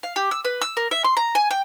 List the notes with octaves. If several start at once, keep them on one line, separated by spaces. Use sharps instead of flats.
F5
G4
E6
B4
E6
A#4
E5
C6
A#5
G#5
G5